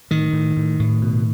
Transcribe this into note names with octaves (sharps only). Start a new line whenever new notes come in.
A2 D#3
A2
A2
A2
B2